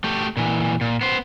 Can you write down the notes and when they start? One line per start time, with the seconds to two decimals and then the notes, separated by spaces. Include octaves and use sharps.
0.04 A3 G4
0.37 A#2 E3
0.81 A#2
1.01 B3 C5